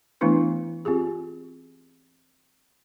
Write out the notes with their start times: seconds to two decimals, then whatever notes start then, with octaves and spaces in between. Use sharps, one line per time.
0.21 E3 A3 B3 D4 E4 B4
0.85 C4 F4 G4 G#4